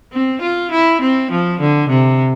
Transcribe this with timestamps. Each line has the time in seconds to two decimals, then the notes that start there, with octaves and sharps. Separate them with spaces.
0.13 C4
0.42 F4
0.71 E4
1.01 C4
1.31 F3
1.60 D3
1.89 C3